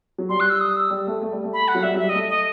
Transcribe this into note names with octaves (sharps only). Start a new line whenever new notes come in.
F#3
G3 C6
F#6
E6
D#6
E6
G3
A3
A3
G3
A3
B5
F#5
F#3
G3 E5
F#3
G3 E5
D#5
A3
D#5